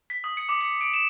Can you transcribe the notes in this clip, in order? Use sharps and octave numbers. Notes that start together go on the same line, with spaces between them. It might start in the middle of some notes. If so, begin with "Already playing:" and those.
B6
D#6
C#7
D6
C#7
D7
E7